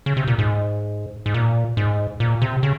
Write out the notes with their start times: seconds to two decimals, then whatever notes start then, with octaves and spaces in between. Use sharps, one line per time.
0.06 C#3
0.17 C3
0.27 A#2
0.39 G#2
1.26 G#2
1.34 A#2
1.77 G#2
2.20 A#2
2.42 C3
2.63 C#3